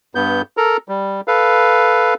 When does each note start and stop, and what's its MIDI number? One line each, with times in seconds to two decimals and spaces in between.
0.15 0.42 43
0.15 0.42 59
0.15 0.42 91
0.57 0.77 69
0.57 0.77 70
0.57 0.77 82
0.88 1.21 55
1.28 2.14 69
1.28 2.14 71
1.28 2.14 77